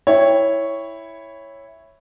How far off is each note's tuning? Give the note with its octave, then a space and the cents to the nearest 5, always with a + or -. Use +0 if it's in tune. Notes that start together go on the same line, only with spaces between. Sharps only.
E4 +0 C#5 +0 G5 +15